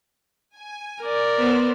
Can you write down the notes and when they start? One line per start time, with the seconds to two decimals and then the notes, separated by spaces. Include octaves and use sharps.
0.56 G#5
1.02 A#4 D5
1.39 B3 C5